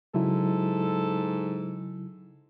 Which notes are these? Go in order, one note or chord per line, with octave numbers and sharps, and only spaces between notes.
G#2 C#3 F#3 E4 A4